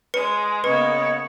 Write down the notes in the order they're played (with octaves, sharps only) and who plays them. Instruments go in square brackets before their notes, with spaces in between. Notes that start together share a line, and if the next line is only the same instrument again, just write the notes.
[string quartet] G#3 [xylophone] B4 C#7
[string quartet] C#3 A#3 B3 [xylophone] B4 [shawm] C#5 [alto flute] D#5